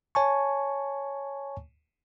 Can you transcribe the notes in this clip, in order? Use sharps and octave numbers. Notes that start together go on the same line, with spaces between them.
C#5 G#5 A5 C#6